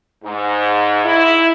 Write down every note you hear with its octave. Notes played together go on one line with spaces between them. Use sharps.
G#2
E4